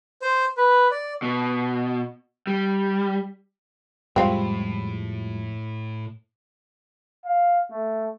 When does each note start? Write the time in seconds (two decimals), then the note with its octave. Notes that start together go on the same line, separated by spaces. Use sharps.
0.22 C5
0.57 B4
0.91 D5
1.22 B2
2.47 G3
4.16 F2 A2 F3 G3 G#3 C4 F5
7.26 F5
7.71 A3